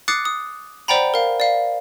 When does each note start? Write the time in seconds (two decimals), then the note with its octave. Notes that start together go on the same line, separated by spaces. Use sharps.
0.08 D6 D#6 F#6 A6 C7 C#7
0.25 D#6
0.88 C5 D5 F#5 G5 A#5 B5
1.14 A#4 F5
1.40 D5 F5